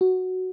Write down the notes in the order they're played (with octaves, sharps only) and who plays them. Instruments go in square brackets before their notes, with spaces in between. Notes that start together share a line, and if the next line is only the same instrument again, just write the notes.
[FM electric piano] F#4